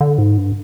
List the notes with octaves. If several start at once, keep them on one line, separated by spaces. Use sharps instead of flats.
D3
G#2
G2